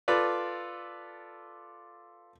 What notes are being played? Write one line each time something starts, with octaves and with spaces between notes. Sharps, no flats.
F4 A4 B4 D5